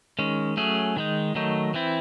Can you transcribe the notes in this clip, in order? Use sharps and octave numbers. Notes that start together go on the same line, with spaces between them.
D#3 G#3 C#4
F#3 A3 C#4 G#4
D#3 G#3 D#4
D#3 F#3 A3 D#4
E3 C4 E4